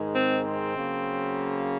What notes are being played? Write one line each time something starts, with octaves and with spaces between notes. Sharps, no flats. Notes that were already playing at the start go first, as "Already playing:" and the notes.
Already playing: G#2 D#3 G#3
C4
C4
C#3 F#3 A#3